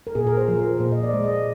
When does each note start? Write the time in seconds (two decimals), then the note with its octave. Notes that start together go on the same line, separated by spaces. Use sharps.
0.07 A#4
0.15 A#2 G#4
0.27 A#4
0.37 C5
0.48 F3
0.59 A#4
0.80 A#2 C5
0.92 D#5
1.03 D5
1.13 G#3
1.24 D#5